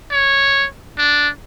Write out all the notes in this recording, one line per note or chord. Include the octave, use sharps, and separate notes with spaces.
C#5
D4